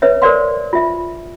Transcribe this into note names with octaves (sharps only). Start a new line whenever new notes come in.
B4 C#5 E5
A#4 C5 D5 F5 C6
F4 E5